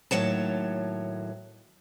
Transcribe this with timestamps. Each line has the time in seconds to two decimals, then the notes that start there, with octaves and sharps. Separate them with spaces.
0.11 D#2 A2 F#3 C#5 A5